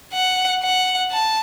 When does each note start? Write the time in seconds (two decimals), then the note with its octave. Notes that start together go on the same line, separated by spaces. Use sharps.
0.14 F#5
0.63 F#5
1.11 A5